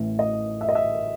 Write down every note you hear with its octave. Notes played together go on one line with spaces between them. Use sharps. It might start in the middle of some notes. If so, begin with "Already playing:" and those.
Already playing: A1 A2 E3
D#5
E5
D#5
E5